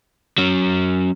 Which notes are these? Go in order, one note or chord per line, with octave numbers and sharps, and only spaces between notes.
F#3 C#4